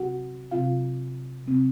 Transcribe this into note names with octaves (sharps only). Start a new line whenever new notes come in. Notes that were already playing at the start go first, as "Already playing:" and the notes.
Already playing: C3 F#3 C4 F#4 F#5
C3 F#3 C4 F4 F5
C3 F#3 C4